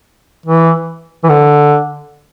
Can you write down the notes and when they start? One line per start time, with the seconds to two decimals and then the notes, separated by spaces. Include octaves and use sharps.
0.46 E3
1.24 E3
1.29 D3